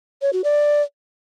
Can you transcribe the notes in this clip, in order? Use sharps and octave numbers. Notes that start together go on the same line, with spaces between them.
C#5
F#4
D5